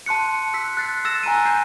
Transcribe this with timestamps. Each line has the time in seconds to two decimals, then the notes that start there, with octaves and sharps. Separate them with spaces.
0.06 A5 C6 F#6 C#7
0.54 E6 F#6 B6
0.77 F#6 A6 C7
1.05 E6 A6 A#6 E7
1.23 G#5 A#5 F#6 D#7
1.45 G6 C7 D#7